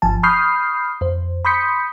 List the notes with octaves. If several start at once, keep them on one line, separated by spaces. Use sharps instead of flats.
G1 F3 G#5 A5
B5 C#6 D#6 F6 G6 C7
F2 C5
B5 C6 D#6 G6 B6 C#7